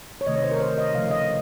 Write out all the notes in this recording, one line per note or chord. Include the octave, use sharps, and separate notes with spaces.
C#5
C3 D#3 A3 D#5
C#5
C5
A#4
C5
D#5
C#3 F3 A3 F5
D#5